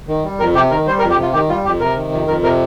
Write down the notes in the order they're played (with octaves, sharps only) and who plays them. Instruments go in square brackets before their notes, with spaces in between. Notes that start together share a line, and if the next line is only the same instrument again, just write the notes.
[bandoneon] D#3
G3
F2 A#4
C3 G4
D#3 A#4
G3 C5
A#4
F2
G4
C3 F4
D#3 G4
G3 F4
F2 G4
C3 A#4
D#3
F2
F2 A#4
C3 A#4